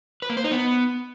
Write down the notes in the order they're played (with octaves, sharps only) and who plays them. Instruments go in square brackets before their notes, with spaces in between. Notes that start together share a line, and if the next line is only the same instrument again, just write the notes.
[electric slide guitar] B4
A#3
C5
D#4
B3